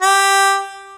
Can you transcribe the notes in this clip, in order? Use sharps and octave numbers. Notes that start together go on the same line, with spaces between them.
G4